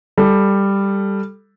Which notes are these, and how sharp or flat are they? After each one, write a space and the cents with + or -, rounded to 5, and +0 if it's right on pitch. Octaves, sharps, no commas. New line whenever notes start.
G3 +10 A4 +0